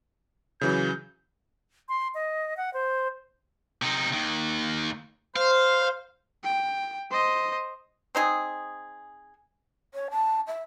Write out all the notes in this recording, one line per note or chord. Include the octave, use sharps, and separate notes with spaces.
C#3 E3 F#3 G6
C6
D#5
F#5
C5
C3 D#4
D#2 D#3
C5 F5
G5
C5 D#5
C4 D#4 G#4
C#5
A5
E5